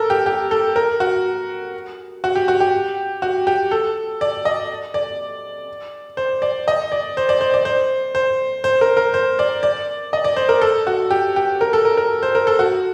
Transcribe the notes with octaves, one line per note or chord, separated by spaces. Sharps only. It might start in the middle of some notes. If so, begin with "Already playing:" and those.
Already playing: A4 A#4
G4
G4
A4
A#4
F#4
F#4
G4
F#4
G4
F#4
G4
A4
D5
D#5
D5
C5
D5
D#5
D5
C5
D5
C5
D5
C5
C5
C5
A#4
A#4
C5
D5
D5
D#5
D5
C5
A#4
A4
F#4
G4
G4
A#4
A4
A#4
A#4
C5
A#4
A4
F#4